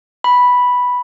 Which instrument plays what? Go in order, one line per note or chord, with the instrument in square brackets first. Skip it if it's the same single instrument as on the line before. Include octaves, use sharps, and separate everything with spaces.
[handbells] B5